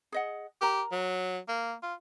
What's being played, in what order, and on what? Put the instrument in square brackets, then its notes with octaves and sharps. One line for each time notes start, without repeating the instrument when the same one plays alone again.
[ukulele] G#4 D#5 F#5
[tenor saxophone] G4 [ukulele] A#4 A#5
[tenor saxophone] F#3
A#3
F4